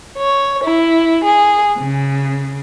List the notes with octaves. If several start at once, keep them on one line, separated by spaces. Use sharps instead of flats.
C#5
E4
G#4
C#3